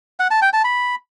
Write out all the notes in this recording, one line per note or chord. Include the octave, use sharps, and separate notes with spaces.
F#5
A5
G5
A5
B5